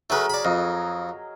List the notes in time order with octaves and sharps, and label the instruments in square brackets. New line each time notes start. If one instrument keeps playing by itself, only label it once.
[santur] F#3 G#4 A#4 [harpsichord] A3 B4
[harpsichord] D5 B5
[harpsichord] F2 [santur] D#5